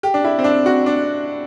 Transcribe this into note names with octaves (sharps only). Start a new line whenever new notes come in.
G4
D4
E4
C4
D4
F#4
D4